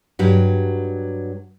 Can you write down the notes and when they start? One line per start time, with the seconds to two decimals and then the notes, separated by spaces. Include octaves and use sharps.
0.19 G2 F#3 G3